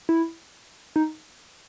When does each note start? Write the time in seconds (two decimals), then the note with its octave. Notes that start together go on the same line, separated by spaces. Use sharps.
0.09 E4
0.96 D#4